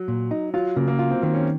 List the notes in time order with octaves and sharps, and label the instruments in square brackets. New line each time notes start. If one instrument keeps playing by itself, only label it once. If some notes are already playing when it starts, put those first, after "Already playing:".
Already playing: [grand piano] F#3
[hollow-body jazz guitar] A#2
D#4
[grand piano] F#3 [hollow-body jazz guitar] F4
[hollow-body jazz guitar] C#3 [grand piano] A#3
[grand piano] A#3
[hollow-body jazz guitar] F4
[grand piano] C4
[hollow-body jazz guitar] D#3 [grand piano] A#3
[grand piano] C#4